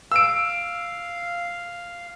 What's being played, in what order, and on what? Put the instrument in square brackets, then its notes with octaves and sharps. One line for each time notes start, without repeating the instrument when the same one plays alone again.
[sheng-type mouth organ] F5 [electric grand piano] E6 D7